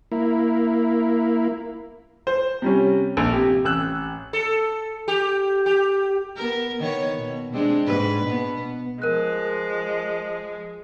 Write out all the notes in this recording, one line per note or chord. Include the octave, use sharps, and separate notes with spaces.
A#3 E4
C5
C3 G3 C#4
A#1
C3 G4
A1 E6 F#6
A4
G4
G4
B3 A#4
D#3 B3 C#5
B2
G#3 C4 D4
G#2 B4
B2 B3
F3 G#3 A#4 F#6